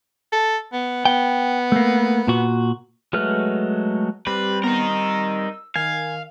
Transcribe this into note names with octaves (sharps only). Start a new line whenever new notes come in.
A4
B3
B3 G5
A3 A#3
A#2 F#4
F#3 G#3 A3 B4 F6
G3 C4 G4 B4
B3 D#4 A#4
E6
D#3 F5 G#5